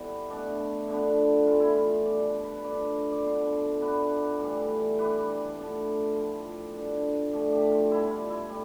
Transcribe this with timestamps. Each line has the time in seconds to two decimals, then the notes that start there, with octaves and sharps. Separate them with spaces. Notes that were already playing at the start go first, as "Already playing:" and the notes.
Already playing: C3 E3 G3 B3 E4 G4 A4
0.30 B2 A3 D4
0.88 D3 F3 B3 D4
1.47 A2 E3 B3 F4
1.60 E4
1.73 F4
2.06 B2 G3 D4 D5
2.44 B4
2.64 D3 A3 D4 D5
3.12 D5
3.23 B2 B3 D4 C5
3.81 B2 B3 D4 B4
4.39 A2 E3 G3
4.98 E3 G3 D4 B4
5.57 A2 F3 B3 D4
6.16 A2 F3 C4 F4
6.45 F4
6.74 D3 G3 B3 D4
7.33 A2 F3 A3 D4 G4
7.52 G4
7.72 F4
7.91 B2 G3 C4 E4
8.11 F4
8.30 E4
8.49 A2 G3